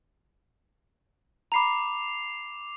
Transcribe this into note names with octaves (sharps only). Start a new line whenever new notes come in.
A#5 B5 D6 C7 F7